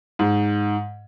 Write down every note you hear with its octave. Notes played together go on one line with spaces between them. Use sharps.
G#2